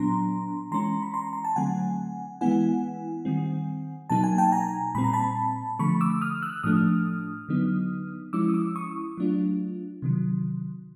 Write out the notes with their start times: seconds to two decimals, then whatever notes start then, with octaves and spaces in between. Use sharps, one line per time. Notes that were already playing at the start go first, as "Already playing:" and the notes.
Already playing: A#2 F#3 B3 D4 A#5 C6
0.72 E3 G#3 C#4 A#5 C6
1.02 B5
1.14 A#5 C6
1.33 A#5
1.44 A5
1.56 D3 F#3 A3 C4 F#5 G#5
2.41 E3 G#3 B3 E4 F#5 G#5
3.25 D#3 G3 C4
4.10 B2 F#3 A#3 D#4 A5
4.24 G#5
4.38 G5 A5
4.52 G#5 A#5
4.95 A#2 G3 C4 B5
5.04 A#5
5.13 A5 B5
5.79 D3 F3 A3 B5 C#6
6.01 D6 E6
6.21 D#6 F6
6.42 E6 F#6
6.63 A2 F3 A3 D4 D#6 F6
7.49 D3 F#3 B3 D#4
8.33 F3 G#3 C#4 E4 D6 E6
8.49 D#6
8.54 D6 E6
8.76 C#6 D#6
9.17 F#3 A3 D4 F4
10.02 C3 D#3 F#3